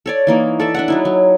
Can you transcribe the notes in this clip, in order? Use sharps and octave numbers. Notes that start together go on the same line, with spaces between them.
A4 C#5 D5
E3 A#3 D#4
A4 D5 E5
D4 E5 F#5
F#3 D#4 E4
F#3